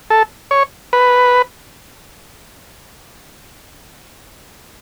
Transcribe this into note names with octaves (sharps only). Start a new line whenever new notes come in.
A4
C#5
B4